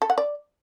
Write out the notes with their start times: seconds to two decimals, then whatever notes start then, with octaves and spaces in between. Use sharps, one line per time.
0.02 A4
0.10 F#5
0.18 D5